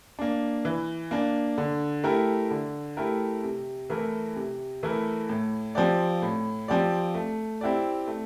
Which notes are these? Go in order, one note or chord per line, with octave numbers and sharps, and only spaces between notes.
A#3 D4
E3
A#3 D4
D3
A3 E4 G4 A#4
D3
A3 E4 G4 A#4
C3
E3 A3 E4 A#4
C3
E3 A3 E4 A#4
A2
F3 C4 G4 D5
A2
F3 C4 G4 D5
A3
C4 E4 G4 D5
A3